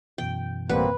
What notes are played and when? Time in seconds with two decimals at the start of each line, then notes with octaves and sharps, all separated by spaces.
0.18 F#2 B2 E3 G5
0.69 A1 G3 A#3 C4 B4 F#5